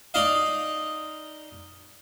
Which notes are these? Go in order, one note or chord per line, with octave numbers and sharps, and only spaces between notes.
D#4 D5 D#5 F5